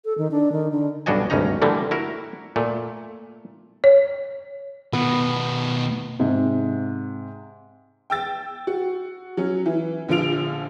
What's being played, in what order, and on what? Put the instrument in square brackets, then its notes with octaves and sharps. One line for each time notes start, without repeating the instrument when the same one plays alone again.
[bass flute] A4
D#3
D4
D#3
D3
[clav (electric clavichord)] B1 G2 D4 F#4 D#5 G#5
G#1 D2 G2 C#4 D#4 A#5
D3 E3 F3 G3 A3 A#3
E4 F#4 A#4
A#2 A3
[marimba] C#5
[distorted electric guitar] B2 D#3 [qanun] B3
[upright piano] G#2 C3
[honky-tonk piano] G5 E6 A6
F#4
F#3 C#4
E3
A#1 D3 F3 F4 D7 F7